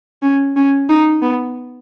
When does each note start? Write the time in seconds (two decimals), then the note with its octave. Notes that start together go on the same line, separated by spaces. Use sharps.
0.23 C#4
0.56 C#4
0.89 D#4
1.22 B3